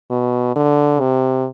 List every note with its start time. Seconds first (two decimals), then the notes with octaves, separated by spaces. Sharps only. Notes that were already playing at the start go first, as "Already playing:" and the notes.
0.11 B2
0.56 D3
1.00 C3